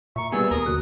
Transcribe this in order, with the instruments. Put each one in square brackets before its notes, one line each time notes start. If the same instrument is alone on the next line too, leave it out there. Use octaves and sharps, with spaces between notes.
[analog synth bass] A#2 [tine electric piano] E5 A#5 [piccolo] C#6
[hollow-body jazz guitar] G3 B3 G#4 [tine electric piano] A#3 [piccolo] E6
[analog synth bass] D#2 [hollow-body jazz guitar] A#4 [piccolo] D#6
[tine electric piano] D3 F#4 F#6